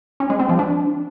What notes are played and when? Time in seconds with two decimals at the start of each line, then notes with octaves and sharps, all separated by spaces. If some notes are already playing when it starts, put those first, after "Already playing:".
0.20 C#4
0.30 G#3
0.39 C4
0.49 F3
0.59 D4